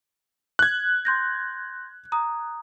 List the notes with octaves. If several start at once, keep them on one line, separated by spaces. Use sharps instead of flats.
F#6 G#6
C6 G6 A#6
A#5 D#6